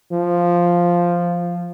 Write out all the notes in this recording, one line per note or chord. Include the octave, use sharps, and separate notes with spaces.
F3